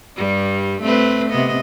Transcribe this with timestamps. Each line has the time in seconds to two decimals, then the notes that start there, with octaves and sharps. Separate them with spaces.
0.17 G2 G3
0.82 A3 C4 B4
1.30 C3 B3 D#5